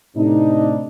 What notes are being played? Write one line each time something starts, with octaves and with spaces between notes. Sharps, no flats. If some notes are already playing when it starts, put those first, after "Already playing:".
A2 C3 D4 D#4